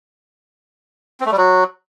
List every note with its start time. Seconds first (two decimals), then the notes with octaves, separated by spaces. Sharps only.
1.20 C4
1.26 A3
1.32 G3
1.37 F#3